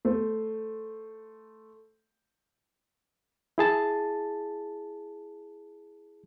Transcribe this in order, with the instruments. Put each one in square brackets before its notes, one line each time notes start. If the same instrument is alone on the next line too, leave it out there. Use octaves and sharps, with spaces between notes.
[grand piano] A3 C5
[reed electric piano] E4 G#4 A5